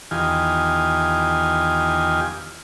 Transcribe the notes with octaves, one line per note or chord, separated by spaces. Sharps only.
E2 D#3 F4 G4 G#5